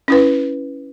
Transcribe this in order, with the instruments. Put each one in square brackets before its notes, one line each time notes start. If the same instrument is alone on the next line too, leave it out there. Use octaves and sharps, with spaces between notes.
[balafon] C#4 E4 B4